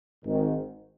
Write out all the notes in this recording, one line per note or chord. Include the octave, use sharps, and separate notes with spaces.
G#1 G#2 D#3